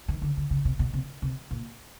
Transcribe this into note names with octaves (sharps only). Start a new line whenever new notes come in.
D#3
D3
D3
C#3
C3
B2
C3
C3
A#2